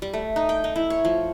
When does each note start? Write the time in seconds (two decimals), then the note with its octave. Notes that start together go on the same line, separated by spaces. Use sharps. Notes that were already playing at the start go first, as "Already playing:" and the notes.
0.02 G3
0.13 A3
0.36 D#4
0.49 G5
0.64 D#4
0.76 E4
0.90 C#5
1.05 F3